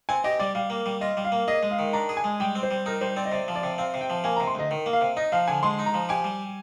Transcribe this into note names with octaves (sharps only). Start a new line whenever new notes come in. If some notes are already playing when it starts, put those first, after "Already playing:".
C4 G#5
G4 D#5
G3 D5
G3 F5
A#3
G3
F4 D#5
G3
F5
A#3
G#4 D#5
G#3
F5
D#3
D4 A#5
G#4
G#5
G#3
G3 G5
C4
C5
G3
D#4 A#4
G3 C5
C4 D5
D#5
C3 D5
F3
D5
C3
C4 F5
C3
G5
F3
A#3 G#5
A#5
C3
C6
D2 D#5
D#3
A#3
F5
C3
D#4 D#5
F3 F5
D3 G#5
G#3 C6
D#4
A#5
F3
G4 G#5
G3